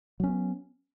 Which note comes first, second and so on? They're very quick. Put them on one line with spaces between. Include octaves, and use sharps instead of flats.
F#3 C#4 B3